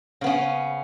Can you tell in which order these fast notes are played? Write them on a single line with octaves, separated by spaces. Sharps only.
C#3 B3 C#4